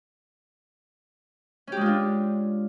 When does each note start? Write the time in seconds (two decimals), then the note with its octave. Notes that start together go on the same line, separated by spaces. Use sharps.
1.67 C#4
1.72 G4
1.77 G#3
1.81 F4
1.86 D4